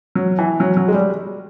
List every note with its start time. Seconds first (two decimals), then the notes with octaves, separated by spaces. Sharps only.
0.15 F#3
0.39 E3
0.60 F#3
0.77 F#3
0.88 G#3
0.94 G3